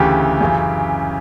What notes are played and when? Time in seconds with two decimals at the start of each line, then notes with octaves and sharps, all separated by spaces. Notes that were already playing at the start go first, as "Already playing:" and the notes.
Already playing: D2 C#3 E3 G4
0.41 F#2 C#3 E3